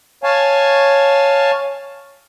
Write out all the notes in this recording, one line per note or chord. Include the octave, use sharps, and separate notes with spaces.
C#5 F5 G#5 A5